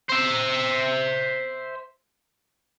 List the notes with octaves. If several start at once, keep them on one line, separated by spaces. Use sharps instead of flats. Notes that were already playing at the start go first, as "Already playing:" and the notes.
C5 E5